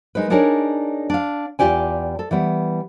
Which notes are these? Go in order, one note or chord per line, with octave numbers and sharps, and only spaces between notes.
G#3 D#4 A#4 B4
D4 D#4 G#4 A#4 C#5 D5
D4 F5
E2 G#2 F4 G4 D5 G#5
A4
E3 G3 B3